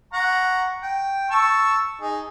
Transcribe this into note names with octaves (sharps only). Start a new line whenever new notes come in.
F#5 A#5 C#6
G5
A5 C#6 E6
D#4 G#4